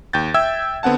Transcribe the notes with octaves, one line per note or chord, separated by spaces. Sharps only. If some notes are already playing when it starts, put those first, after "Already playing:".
D#2 G5 G6 A6
E5 G5 E6 G#6
D3 B3 C4 F#5 A5